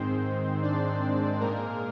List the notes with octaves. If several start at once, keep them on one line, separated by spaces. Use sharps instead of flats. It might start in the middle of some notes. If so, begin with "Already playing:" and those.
Already playing: G#2 D#3 G#3 C4 C5
D4 D5
A#2 G#3 A#3 A#4